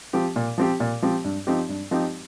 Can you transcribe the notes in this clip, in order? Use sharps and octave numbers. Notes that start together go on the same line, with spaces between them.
F3 C4 G4
A#2
F3 C4 G4
A#2
F3 C4 G4
G2
F3 C4 D#4 G4
G2
F3 C4 D#4 G4